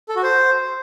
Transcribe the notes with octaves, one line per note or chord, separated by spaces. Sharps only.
A4
F#4
C5